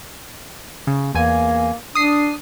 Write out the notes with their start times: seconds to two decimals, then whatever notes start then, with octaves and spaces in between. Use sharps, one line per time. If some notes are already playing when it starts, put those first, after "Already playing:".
0.87 C#3
1.15 E2 A#3 G#5
1.95 D4 D#6 C7